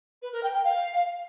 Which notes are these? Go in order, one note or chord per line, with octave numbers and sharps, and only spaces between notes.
B4
A#4
G5
G5
F5